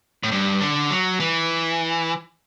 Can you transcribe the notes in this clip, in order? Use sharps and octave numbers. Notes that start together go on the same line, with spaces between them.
A2
G2
D3
F#3
E3